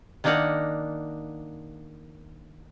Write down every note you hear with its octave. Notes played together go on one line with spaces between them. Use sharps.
D#3 A#3 D4 D#4 A#4 F#5